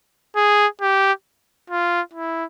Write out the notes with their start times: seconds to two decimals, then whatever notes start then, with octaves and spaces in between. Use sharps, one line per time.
0.36 G#4
0.81 G4
1.70 F4
2.14 E4